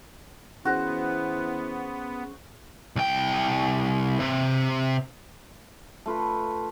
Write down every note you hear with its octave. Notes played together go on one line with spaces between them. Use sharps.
E3 B3 C#4 F#4 G#4 C5
C2 G5
C3
A3 F4 B4